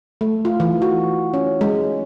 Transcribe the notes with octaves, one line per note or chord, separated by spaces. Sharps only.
A3
F4
E3
F#4
C#4
G#3